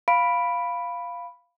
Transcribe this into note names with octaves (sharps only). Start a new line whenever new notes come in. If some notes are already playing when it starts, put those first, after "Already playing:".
F5 B5 D7